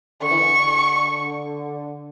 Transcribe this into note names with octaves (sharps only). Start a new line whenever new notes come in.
D3 C#6
E3
D3